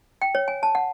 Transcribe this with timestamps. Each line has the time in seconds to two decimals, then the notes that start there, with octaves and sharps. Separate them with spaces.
0.22 G5
0.35 C#5
0.48 G#5
0.63 A5
0.75 F#5